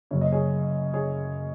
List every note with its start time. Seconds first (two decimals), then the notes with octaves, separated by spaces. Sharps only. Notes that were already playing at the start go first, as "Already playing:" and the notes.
0.11 F#1 F#2 C#3 C#5
0.21 D#5
0.32 G#4 C#5
0.94 G#4 C#5